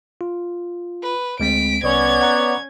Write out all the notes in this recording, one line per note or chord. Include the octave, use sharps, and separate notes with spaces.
F4
B4
D2 G#3 C4 B6 D7
C2 B3 C#4 C#5 D5 G#6
F#5 A#5 F#6